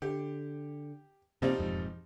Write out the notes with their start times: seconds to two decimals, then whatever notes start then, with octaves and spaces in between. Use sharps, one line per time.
0.02 D3 G4
1.42 C3 F3 G3 A#3 C4 D#4
1.58 E1 F2 G#2